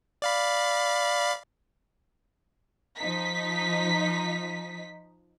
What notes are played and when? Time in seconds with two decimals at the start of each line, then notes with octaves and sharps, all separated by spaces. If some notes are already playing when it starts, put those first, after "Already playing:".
0.22 D5 F5 B5
2.97 F3 D#4 B6